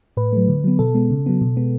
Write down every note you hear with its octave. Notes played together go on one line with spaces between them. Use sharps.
A2 B4
F#3 A3
D3
F#3 B3
B2 A4
G#3 B3
C#3
F#3 B3
B2
G#3 B3